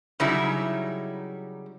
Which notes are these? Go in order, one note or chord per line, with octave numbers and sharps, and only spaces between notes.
C#3 F#3 G3 D#4 E4